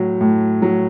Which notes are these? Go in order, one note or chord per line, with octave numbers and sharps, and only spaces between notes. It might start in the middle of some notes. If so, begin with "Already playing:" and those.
Already playing: A2 F#3
A2
F#3